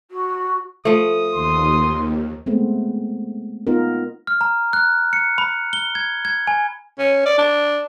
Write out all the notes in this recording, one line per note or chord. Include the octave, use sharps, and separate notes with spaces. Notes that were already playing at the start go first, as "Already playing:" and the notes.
F#4
F3 A3 D#6
D#2 C6
G#3 A3 B3 C4
B3 D#4 F4 A#4
F6
A#5
F#6
C#7
B5
G7
G#6
G#6
G#5
C#4
D5
D4